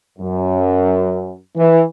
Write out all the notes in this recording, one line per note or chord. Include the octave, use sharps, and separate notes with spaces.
F#2
E3